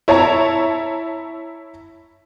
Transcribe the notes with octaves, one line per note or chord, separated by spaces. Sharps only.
E4 C#5 A5 A#5